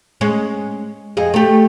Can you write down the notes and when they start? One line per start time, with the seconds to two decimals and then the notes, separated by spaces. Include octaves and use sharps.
0.21 G#3 C#4
1.17 F2 G#4 D#5
1.34 A3 G4